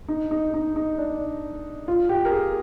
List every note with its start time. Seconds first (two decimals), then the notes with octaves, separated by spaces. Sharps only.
0.08 D#4
0.31 D#4
0.54 D#4
0.76 D#4
0.98 D4
1.88 F4
2.09 G4
2.25 A#4
2.32 G#4